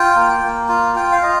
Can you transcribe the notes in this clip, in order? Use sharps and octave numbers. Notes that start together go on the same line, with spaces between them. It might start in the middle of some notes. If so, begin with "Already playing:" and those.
Already playing: F4 G5
A#3
A#3
F4
F4 G5
F5
F4 D#5